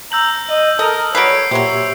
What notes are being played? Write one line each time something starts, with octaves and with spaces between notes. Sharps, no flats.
A#5 E6 G6 F#7
D#5
A4 A#4 D#5 D#6 F6
F#3 G3 B4 C#5 C7 D7
A#2 F#3 G4 C5 C#5 E5